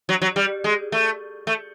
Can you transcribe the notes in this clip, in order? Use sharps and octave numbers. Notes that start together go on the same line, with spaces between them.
F#3
F#3
G3
G#3
A3
A3